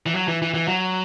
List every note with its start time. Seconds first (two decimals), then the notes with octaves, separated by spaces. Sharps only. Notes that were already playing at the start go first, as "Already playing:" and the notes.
0.06 E3
0.15 F#3
0.28 E3
0.42 E3
0.54 E3
0.68 F#3